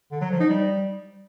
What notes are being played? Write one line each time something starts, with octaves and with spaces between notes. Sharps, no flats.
D3
F#3
F3
D#4
G3